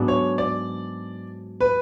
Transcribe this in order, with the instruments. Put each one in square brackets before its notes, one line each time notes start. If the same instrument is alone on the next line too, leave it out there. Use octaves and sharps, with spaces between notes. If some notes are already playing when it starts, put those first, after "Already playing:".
Already playing: [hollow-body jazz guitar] G#2 F#3 B3 D4
[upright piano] C#5
D5
B4